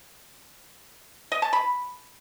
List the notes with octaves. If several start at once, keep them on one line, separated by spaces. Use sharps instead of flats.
D#5
A5
B5